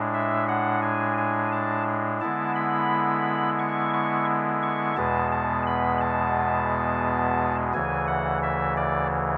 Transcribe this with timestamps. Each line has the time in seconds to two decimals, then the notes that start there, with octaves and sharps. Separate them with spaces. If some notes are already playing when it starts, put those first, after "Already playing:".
Already playing: A2 G#3 D4
0.14 E5
0.48 F#5
0.82 G#5
1.18 G#5
1.52 A5
2.21 D3 G#3 B3 E4 A5
2.56 B5
3.59 C#6
3.94 C#6
4.63 C#6
4.97 E2 B2 G#3 B3 A5
5.32 A5
5.67 B5
6.01 A5
7.74 D2 C#3 E3 G#5
8.07 F#5
8.43 E5
8.77 D5